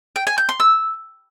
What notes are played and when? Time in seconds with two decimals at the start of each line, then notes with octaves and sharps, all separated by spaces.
0.16 G5
0.27 G#5
0.38 G6
0.49 C6
0.60 E6